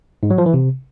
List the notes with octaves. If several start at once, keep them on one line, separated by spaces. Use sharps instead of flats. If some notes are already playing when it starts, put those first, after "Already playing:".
G#2
F#3
F3
E3
C3